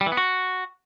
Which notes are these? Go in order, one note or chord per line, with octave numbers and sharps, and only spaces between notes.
G3
E3
B3
F#4